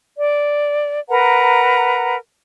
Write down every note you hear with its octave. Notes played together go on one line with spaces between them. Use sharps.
D5
A#4 B4 F#5 A#5